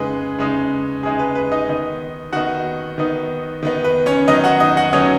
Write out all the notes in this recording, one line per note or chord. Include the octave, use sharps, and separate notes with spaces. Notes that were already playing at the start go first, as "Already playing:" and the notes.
Already playing: C#3 G#3 D#4 G#4 B4
C#3 G#3 D#4
C#3 G#3 D#4 G#4
B4
B4
D#4 D#5
D#3 B3 D#4
D#3 B3 D#4 F#4 F#5
D#3 B3 D#4
D#3 B3 D#4
B4
C#4 C#5
D#3 F#3 B3 D#4 D#5
F#4 F#5
D#4 D#5
F#4 F#5
D#3 F#3 B3 C#4 D#4 C#5